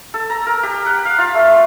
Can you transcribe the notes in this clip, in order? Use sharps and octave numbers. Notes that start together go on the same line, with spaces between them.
A4
A#5
A#4
G4
F#5
F5
F4
A3